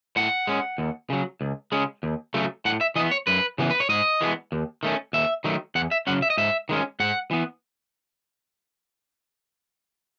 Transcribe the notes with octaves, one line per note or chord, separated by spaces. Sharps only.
A2 F#5
G#3 C#4
D#2
C#3 F#3
C#2
C#3 G#3 C#4
D#2
C#3 F#3 A3
A2 F#5
E5
E3 B3 D#5
C#5
F#2 B4
C#3 E3 B3
B4
C#5
G#2 D#5
E3 G#3 B3
D#2
D#3 A3 C#4
D#2 E5
D#3 F#3 A3
E2 F#5
E5
C#3 F#3 C#4 F#5
E5
D#5
G#2 E5
D#3 G#3 C#4
G#2 F#5
E3 B3